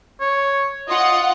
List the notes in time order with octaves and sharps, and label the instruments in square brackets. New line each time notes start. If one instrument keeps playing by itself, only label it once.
[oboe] C#5
[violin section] F4 F#5 [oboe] D#5